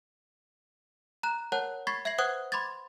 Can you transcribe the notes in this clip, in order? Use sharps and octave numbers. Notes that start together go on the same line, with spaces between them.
A#5 F#6 E7
A#4 C#5 F#5 A5 F#6
B5 C#6 G#6 A6 B6 C7
E5 G#6 A#6 C7 F#7
B4 C5 F#5 D#6 F#6 G#6
B5 C6 D6 G#6 A6